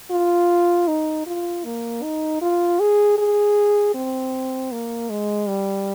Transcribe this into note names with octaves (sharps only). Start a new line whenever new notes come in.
F4
D#4
F4
A#3
D#4
F4
G#4
G#4
C4
A#3
G#3
G3